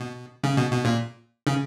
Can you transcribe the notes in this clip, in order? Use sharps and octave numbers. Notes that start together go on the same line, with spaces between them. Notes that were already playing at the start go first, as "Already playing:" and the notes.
Already playing: B2
C#3
B2
B2
A#2
C#3